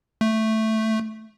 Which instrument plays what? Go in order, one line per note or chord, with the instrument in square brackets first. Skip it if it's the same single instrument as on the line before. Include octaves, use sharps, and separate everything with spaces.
[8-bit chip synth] A3